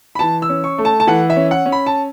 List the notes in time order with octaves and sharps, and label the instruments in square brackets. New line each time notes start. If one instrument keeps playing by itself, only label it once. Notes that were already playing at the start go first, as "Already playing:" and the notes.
[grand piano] B5
E3 A5
E6
C#4
C#6
A3
A5
A5
E3 F#5
E5
C#4
F#5
C#4
B5
A5